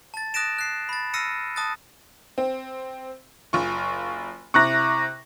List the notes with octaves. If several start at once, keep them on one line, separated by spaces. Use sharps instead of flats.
A5 A6
D#6 F#6 A6 A#6 D7 E7
F#6 C7
B5 A6
E6 F6 A#6 C7 C#7 D#7
A5 D#6 F#6 A6
C4
F#1 F4 C#6
C3 E4 A#5 C#6 F#6 A#6